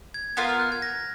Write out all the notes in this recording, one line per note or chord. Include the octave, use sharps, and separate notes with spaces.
G#6
B3 F4 A#4
F6
F#6
G#6
A#6